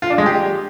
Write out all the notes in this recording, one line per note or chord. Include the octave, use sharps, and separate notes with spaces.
F4
D4
G#3
G4